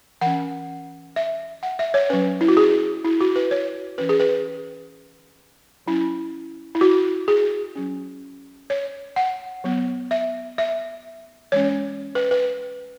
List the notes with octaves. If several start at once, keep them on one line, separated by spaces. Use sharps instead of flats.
E3 C#4 F#5
E5
F#5
E5
C#5
F#3 C#4 B4
E4
F#4
G#4
E4
F#4
B4
C#5
E3 C#4 B4
G#4
B4
F#3 C#4 E4
E4
F#4
G#4
F#3 C#4
C#5
F#5
F#3 B3
E5
E5
E3 G#3 C#4 C#5
B4
B4